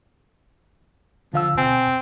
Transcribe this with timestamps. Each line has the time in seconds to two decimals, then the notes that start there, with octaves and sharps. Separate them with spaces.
1.34 D3 F3 F5 E6
1.57 B2 C4 G#5